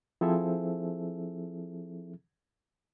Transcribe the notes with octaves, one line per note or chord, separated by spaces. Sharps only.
F3 C4 E4 G#4 A4 E5